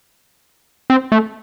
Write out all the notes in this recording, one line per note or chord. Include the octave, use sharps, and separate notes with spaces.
C4
A3